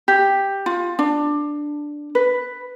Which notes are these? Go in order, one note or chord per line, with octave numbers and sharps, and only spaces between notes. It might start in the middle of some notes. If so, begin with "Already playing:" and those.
G4
F4
D4
B4